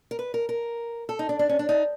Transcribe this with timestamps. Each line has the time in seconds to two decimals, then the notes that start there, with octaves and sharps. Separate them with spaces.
0.11 A#4
0.19 B4
0.34 A#4
0.49 A#4
1.09 A4
1.19 D#4
1.29 D4
1.39 D4
1.49 C#4
1.59 D4
1.69 D#4